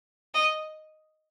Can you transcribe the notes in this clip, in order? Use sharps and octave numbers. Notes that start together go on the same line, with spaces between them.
D#5